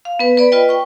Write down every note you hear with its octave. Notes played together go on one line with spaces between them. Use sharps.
F5
B3 B4
B4 D5 B5
F4 B4 D#5 G5
G5 C#6